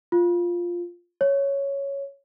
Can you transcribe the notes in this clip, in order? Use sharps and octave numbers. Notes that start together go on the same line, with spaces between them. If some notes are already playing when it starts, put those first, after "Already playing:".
F4
C#5